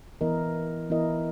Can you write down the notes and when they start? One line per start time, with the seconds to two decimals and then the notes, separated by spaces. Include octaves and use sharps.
0.21 E3 B3 E4 A#4 D#5
0.90 E3 B3 E4 A#4 D#5